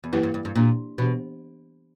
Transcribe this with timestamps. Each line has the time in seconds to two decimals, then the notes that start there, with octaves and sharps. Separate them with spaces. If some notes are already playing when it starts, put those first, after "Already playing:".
0.04 E2
0.12 F#2 E3 A#3 E4 G4 B4
0.23 G2
0.34 G2
0.45 G2
0.55 A#2 A#3 D4 G4
0.98 B2 E3 B3 D4 G4